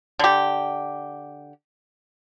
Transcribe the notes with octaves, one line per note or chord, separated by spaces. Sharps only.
D3 G4